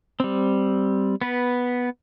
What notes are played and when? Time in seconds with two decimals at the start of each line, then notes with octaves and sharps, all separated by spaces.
0.20 G3 C4
1.21 B3 B4